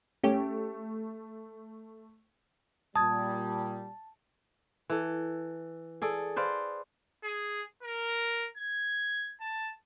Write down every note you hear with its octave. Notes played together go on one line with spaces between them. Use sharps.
A3 C#4 G4
A#2 G3 A5 D#6 G#6
E3 A4
G#4 A4 D5
B4 C5 D5 F5
G#4
A#4
G#6
A5